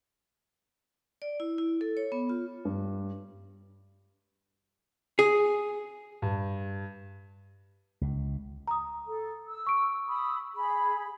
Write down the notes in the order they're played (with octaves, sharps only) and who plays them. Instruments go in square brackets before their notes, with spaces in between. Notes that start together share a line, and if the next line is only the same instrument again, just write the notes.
[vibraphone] D5
E4
E4
A4
C#5
B3
F4
[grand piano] G2
[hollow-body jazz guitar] G#4
[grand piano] G2
[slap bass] C#2
[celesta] A#5 D#6
[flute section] A4
E6
[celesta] C#6 D7
[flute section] B5 D#6 E6
G#4 B5